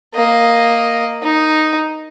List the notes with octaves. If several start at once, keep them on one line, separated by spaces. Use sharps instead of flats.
A#3 D#5
D#4